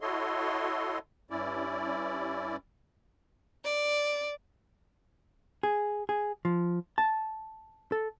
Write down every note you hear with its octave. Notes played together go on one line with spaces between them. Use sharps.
E4 F#4 A4 C#5 D#5 C6
G2 C#4 E4 D5
D5
G#4
G#4
F3
A5
A4